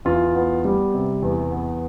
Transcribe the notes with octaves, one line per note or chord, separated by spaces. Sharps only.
E2 F4
B3
G3
C3
E2
B3